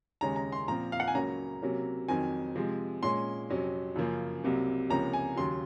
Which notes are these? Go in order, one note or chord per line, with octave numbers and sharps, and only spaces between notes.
D#2 C#3 G#3 C#4 A#5
A#5
C6
A#2 F3 C4 A#5
F5
F#5
G#5
C#2 C#3 F#3 A#3 C#4 A#5
C3 F#3 A#3 C#4
F2 D#3 F#3 C4 G#5
C3 F3 G#3
A#2 G#3 C#4 C6
F2 C3 F#3 C#4
F#2 C#3 F3 A#3
C2 C3 F#3 A#3
C#2 C3 F3 A#3 C#4 A#5
G#5
D#2 C#3 F#3 C6